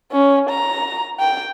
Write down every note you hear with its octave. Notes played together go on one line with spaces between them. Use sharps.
C#4
A#5
G5